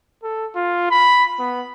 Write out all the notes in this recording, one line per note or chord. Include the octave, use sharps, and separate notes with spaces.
A4
F4
B5
B3